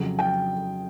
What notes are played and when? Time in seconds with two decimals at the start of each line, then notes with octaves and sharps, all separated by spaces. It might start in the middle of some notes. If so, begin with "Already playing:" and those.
Already playing: F2 C#3 F#3
0.19 G5